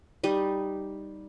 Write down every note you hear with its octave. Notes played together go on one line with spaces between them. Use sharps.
G3 D#4 D#5